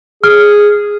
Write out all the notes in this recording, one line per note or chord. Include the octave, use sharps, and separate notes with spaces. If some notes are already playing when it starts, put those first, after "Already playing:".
G#4 F6